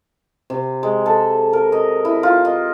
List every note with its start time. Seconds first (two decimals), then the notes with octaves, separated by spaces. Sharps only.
0.50 C3
0.83 G#3
1.06 A4
1.53 A#4
1.72 D#5
2.05 E4
2.23 F4
2.45 D#5